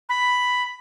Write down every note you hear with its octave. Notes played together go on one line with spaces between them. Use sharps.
B5